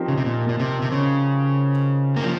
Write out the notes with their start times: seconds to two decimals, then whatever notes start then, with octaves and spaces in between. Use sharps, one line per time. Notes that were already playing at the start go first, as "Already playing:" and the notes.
Already playing: F3 C4 D#4 G4 A#4
0.08 C#3
0.18 C3
0.26 A#2
0.49 A#2
0.60 C3
0.82 C3
0.92 C#3
2.17 A#3
2.24 F3